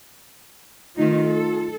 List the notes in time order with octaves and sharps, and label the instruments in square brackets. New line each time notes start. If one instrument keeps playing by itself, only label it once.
[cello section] D#3 A3 D#4 [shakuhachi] F4
[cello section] A4